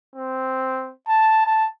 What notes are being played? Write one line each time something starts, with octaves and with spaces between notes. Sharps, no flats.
C4
A5
A5